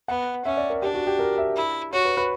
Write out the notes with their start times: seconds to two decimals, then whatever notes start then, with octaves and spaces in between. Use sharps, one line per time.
0.08 B3 F#5
0.45 C#4 E5
0.57 D5
0.70 A#4
0.82 D4 G4
0.94 F#4
1.07 G4
1.19 A#4
1.38 E5
1.56 E4
1.93 F#4 C#5
2.05 B4
2.17 B4